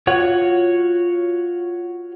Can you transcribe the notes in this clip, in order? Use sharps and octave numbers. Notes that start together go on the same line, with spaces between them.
F4 F#4 C#5 F#5